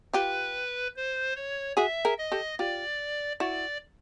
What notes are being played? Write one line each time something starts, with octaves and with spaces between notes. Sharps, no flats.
F4 G4 B4
C5
C#5
F#4 G#4 E5
G#4 A#4
D#5
G4 A4
F4 G4 D5
E4 F#4 D5